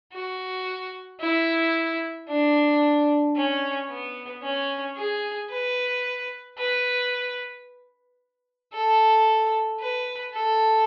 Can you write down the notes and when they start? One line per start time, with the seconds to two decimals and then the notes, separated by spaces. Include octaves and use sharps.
0.13 F#4
1.21 E4
2.29 D4
3.36 C#4
3.90 B3
4.43 C#4
4.96 G#4
5.51 B4
6.58 B4
8.73 A4
9.80 B4
10.34 A4